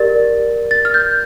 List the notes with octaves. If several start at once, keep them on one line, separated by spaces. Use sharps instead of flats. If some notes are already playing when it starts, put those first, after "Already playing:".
Already playing: G4 A#4 D5 A6
A6
F6
G6